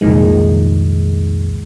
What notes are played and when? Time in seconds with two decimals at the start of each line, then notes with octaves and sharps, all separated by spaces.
0.01 C2 F2 A#2 D#3 G#3